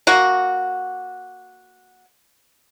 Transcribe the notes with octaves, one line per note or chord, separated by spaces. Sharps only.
A#3 F#4